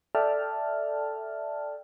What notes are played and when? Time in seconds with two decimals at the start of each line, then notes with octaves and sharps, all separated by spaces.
0.15 A4 D5 E5 G5 A5 F6